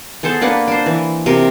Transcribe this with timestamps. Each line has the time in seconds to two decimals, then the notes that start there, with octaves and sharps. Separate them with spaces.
0.23 B3 G#4 A4 C5
0.41 A#3 D4 B4 F#5
0.68 D4 C5
0.86 E3
1.26 C3 A#4